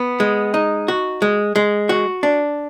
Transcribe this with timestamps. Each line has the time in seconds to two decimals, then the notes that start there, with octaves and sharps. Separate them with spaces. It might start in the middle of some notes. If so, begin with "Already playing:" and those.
Already playing: B3
0.20 G#3
0.54 D#4
0.88 F#4
1.22 G#3
1.56 G#3
1.89 F#4
2.23 D4